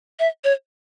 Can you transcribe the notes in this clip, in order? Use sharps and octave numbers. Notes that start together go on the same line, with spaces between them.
E5
C#5